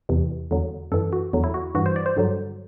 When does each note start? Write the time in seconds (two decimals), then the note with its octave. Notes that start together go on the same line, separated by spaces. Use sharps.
0.09 E2 C3 E3
0.51 E2 D3 F#3
0.92 F#2 E3 A4
1.13 F#4
1.33 E2 D3 F#3
1.44 E4
1.54 F#4
1.75 G2 E3 F#4
1.86 C5
1.96 D5
2.06 C5
2.17 G2 D3 F#3